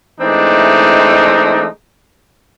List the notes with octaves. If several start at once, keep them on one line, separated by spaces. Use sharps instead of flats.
E3 G#3 A3 C4 D4 D#4